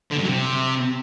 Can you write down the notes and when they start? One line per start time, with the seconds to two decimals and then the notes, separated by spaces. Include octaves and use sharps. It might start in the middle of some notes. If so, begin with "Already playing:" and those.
0.11 D3
0.17 G2
0.22 F#3
0.28 C3